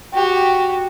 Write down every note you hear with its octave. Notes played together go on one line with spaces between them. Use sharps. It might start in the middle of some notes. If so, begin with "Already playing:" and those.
F#4 G4